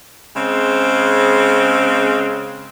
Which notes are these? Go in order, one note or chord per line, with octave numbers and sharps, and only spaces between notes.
C#3 G#3 C4